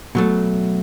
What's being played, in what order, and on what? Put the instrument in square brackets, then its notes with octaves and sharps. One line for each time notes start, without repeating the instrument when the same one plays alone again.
[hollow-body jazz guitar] B2 F#3 A3